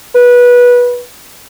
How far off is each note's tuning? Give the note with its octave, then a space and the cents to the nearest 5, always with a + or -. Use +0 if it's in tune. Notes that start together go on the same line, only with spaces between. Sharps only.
B4 -20